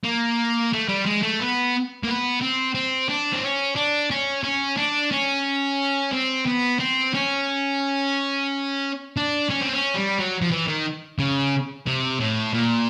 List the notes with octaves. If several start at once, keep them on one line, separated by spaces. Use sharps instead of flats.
A#3
A3
G3
G#3
A3
B3
A#3
B3
C4
C4
D4
C4
C#4
D4
C#4
C#4
D4
C#4
C4
B3
C4
C#4
D4
C#4
C4
C#4
G3
F#3
F3
E3
D#3
C#3
C3
A2
A#2